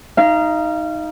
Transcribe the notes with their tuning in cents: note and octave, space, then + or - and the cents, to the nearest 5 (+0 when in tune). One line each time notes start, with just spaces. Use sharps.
D#4 +10 F5 -25